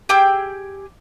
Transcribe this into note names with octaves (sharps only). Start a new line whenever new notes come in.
G4 G#4 G5 E6